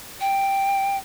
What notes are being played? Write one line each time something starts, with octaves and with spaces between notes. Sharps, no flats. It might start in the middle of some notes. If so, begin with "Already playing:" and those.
G5